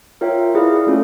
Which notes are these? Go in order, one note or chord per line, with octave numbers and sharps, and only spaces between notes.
F4 A#4 C#5 E5 G5
E4 G#4 B4 D5 F5
A3 C#4 F4 A4